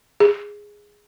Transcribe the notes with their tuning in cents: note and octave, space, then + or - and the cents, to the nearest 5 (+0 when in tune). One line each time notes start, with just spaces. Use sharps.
G#4 -5